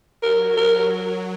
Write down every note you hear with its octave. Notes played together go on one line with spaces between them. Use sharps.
F#3 A#4
A#4